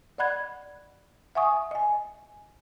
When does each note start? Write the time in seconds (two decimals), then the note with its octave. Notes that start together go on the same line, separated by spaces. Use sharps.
0.18 D5 D#5 F#5 B5 F#6 G#6
1.35 E5 F#5 G#5 C#6 D#6
1.71 D#5 G#5